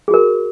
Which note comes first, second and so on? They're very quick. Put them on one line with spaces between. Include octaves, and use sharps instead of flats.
G#4 F#4 A#4